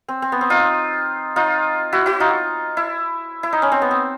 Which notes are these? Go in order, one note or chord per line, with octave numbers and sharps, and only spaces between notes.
C4
C4
B3
C4
D#4 F4
D#4 F4
E4 F#4
E4 F#4
D#4 F4
E4
E4
D#4
C#4
C4
B3
C4